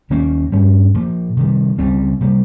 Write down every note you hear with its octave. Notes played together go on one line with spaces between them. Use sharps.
D#2 D#3 A#3 C#4
G2 G3 C#4
A#2 F3 A#3
C3 D#3 G3
C#2 C#3 G3 C4
C3 G3 A#3